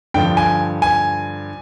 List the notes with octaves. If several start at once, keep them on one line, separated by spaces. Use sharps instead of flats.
G2 D3 F3 G5
G#5
G#5